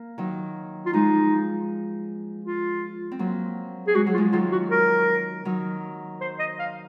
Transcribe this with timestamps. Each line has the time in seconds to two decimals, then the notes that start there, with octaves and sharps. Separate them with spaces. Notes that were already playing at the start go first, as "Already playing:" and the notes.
Already playing: A#3
0.18 D#3 F#3
0.86 F4
0.93 F3 G#3 D#4
2.45 F4
3.12 C4
3.19 F#3 A#3
3.88 G#4
3.95 G#3 F#4
4.07 F#3
4.14 F4
4.18 F3 G#3
4.32 D#3 F#3 F4
4.52 F#4
4.71 A#4
5.45 D#3 F#3
6.21 C5
6.39 D#5
6.59 F5